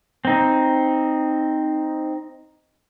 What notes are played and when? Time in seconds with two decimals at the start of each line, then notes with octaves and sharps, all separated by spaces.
0.25 C4 D#4